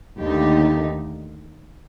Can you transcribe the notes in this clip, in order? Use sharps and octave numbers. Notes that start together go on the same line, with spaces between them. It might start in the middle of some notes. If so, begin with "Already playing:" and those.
D#2 D3 A3 D#4 G4